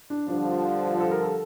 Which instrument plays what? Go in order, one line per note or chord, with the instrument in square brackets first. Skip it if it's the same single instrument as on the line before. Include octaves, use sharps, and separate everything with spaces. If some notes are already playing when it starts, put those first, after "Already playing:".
[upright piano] D4
[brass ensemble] G2 D3 F3 [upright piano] D4
[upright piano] A4
A#4
A4